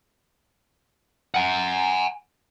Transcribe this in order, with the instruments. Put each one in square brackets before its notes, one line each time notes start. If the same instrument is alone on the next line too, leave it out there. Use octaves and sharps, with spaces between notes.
[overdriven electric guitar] F#5 G#5